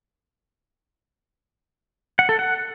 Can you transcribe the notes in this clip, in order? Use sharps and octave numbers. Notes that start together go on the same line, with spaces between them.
F#5
A4
F#5